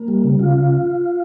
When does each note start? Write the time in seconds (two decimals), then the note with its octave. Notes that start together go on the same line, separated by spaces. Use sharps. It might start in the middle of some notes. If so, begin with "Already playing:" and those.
Already playing: A#3
0.08 G3
0.24 C#3
0.39 C#3 F4